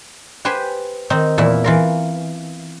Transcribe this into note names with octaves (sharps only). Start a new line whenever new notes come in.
G4 B4 C5 G5 G#5
D#3 C4 D#4
E2 A#2 E4 E5
E3 F4 A#4